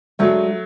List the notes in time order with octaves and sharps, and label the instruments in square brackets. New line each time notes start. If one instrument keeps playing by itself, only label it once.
[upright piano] F#3 A3 [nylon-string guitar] G#3 D4 F#4 A4